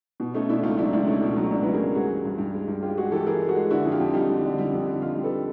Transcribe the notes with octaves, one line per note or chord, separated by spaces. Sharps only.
B2
A3 C#4 D#4
B2 D4 E4
C#2 D#4 F4
F#3 D4 E4
C#2 D4 E4
A3 C#4 D#4
B2
F#3
C#2 D4 E4
F#3 B4
G#4 A#4
C#2
G2 F#4 G#4
E3
G2
G2
G#3
G2
G#3 F4 G4
G#3 F#4 G#4
E3 G4 A4
E3 G#4 A#4
G#3
F#4 G#4
G#3
D3 E4 F#4
F2
F4 G4
F2
G3 D#4 F4
D3
D3
G3
F2
D3
F2 D#4 F4
G3
A4 B4